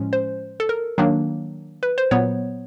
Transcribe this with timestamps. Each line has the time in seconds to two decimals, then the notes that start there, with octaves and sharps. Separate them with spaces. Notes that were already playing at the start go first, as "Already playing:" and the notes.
Already playing: A2 F3 G#3 C#4
0.13 C5
0.60 A4
0.69 A#4
0.98 D#3 F#3 A#3 D4
1.83 B4
1.98 C5
2.11 A#2 F#3 B3 C#5